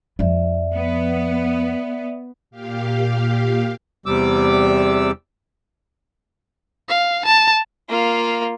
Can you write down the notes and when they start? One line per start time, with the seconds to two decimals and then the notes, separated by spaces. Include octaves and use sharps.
0.19 F2 F3 D5 E5
0.74 B3
2.51 A#2 G4 F5
4.06 E2 C3 G3 D6 E6
6.89 F5
7.26 A5
7.89 A#3 F4